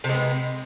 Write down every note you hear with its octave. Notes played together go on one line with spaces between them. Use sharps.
C3 G#3 B3